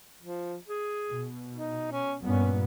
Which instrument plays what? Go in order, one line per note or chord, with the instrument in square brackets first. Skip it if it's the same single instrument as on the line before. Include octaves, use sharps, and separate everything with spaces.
[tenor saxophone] F3
G#4
[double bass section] B2
[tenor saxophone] D#4
C#4
[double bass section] G2 A#2 B3 [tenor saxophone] C#4